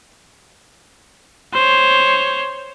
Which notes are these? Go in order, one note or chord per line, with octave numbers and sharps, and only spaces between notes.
C5 C#5